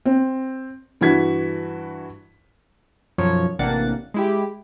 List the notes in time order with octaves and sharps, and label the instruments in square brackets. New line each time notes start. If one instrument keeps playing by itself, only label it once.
[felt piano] C4
G2 E3 E4 F#4 G#6 B6
[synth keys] B1 F#2 F3 C#5
A1 C3 A#3 D4 F#5 A6
G#3 E4 G4